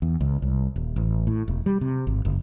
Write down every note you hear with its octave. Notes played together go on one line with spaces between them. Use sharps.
E2
C#2
C2
D#1
A1
A2
E1
G3
C3
G#1
F#1